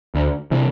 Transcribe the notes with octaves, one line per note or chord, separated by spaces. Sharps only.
D2
C3 E3